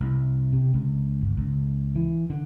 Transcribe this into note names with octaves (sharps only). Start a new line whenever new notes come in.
C2
C3
C#2
G1
C#2
E3
D3